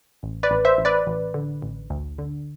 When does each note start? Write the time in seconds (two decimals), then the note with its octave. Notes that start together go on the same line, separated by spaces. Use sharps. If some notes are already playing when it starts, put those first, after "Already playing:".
0.23 A1
0.43 B4 D5
0.51 A1
0.65 C5 E5
0.78 A1
0.85 B4 D5
1.07 A1
1.34 D3
1.62 A1
1.90 D2
2.18 D3